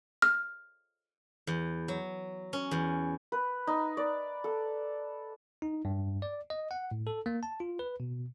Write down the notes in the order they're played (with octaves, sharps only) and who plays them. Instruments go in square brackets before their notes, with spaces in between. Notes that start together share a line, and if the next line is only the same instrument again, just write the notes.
[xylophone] F6
[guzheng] E2
F#3
C#4
E2
[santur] B4
D#4
D5
A4
[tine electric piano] D#4
G2
D5
D#5
F#5
A2
A4
A#3
A5
F4
B4
B2